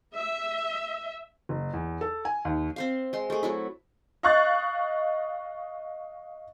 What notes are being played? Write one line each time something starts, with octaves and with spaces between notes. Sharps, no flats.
E5
F#1
E2
A4
G#5
D#2
C4 C5 F5
G#3 C6
A3 G#4
F#3 A3 E4
D#5 F5 C#6 F#6 A6